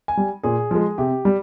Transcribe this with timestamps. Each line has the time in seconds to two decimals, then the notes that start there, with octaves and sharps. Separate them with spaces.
0.08 G#5
0.17 G3
0.43 A#2 G#4
0.71 F3 G#3
0.98 C3 G4
1.25 G3